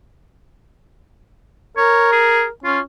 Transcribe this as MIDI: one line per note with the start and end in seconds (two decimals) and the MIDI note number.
1.77 2.49 70
1.77 2.12 73
2.12 2.44 68
2.64 2.81 61
2.64 2.78 65